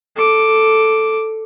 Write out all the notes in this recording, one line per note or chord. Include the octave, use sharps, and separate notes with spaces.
A4 D6